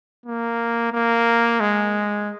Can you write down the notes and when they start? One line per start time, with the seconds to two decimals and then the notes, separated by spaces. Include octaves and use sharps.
0.26 A#3
0.93 A#3
1.60 G#3